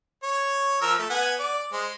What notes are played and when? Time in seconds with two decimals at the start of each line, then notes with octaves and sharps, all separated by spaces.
0.23 C#5
0.82 F3 A#4 E6
0.98 A3
1.10 B3 F#5 G#5
1.39 D5
1.72 G#3 C5